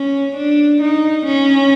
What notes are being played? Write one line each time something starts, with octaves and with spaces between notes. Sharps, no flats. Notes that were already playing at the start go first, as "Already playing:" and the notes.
Already playing: C#4
D4
D#4
C#4